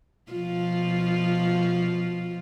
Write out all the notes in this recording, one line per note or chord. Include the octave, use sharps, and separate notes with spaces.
B2 F3 F4